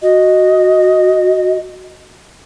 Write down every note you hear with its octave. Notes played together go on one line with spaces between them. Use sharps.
F#4 D#5